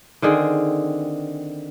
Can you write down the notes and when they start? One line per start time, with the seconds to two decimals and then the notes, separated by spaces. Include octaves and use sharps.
0.22 D3 D#3 C4 G#4